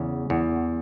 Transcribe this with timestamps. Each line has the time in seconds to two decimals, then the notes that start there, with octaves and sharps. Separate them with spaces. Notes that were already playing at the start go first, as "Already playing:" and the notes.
Already playing: E2 C#3
0.30 E2